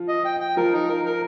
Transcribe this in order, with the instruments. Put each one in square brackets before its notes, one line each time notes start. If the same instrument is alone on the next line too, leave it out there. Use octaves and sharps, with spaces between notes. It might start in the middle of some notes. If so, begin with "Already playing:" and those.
Already playing: [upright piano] F3
[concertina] D#5
G5
G5
[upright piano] F3 [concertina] A#4
[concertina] D#4
A#4
A#4